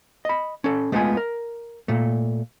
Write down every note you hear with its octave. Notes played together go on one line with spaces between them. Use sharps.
D#5 B5
C#4 A4
G#3 A3 B3 D#4 F4 G#5
A#4
A#2 A3